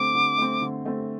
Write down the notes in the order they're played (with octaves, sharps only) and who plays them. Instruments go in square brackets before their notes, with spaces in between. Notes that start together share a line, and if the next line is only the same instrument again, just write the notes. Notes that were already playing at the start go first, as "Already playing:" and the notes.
Already playing: [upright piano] D3 A3 C4 [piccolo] D6
[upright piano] D3
A3 C4
D3
A3 C4